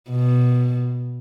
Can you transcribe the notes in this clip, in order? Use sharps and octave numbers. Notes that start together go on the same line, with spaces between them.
B2